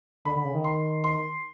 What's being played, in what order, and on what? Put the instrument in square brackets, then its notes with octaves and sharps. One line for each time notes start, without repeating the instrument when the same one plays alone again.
[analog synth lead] D3 [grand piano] B5
[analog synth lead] D3
C#3
D#3
[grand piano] C6
C6